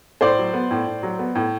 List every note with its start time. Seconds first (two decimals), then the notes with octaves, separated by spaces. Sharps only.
0.21 A2 C5 D5
0.38 F#3
0.54 B3
0.71 A2
0.87 A2
1.03 F#3
1.19 B3
1.35 A2